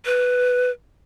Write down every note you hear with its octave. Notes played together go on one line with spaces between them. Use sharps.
B4